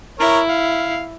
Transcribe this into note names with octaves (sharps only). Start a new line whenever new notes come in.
E4 A#4 C#5
F5